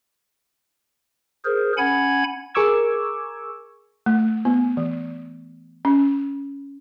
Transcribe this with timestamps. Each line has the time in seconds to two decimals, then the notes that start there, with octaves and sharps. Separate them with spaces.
1.45 G#4 A#4 C5
1.78 C#4 F#5 G#5 B5 G#6
2.55 G#4 A#4 C#6 D6 E6 G#6
4.06 A3
4.45 B3
4.77 E3
5.85 C#4